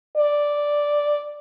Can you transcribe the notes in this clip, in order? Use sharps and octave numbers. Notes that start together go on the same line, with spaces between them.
D5